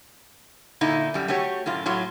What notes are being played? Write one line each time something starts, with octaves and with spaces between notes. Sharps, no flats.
A#2 D3 D#4 E4
F#2 G3
A3 F#4 G4 C#5
F#2 A2 F4
A2 F#3 F4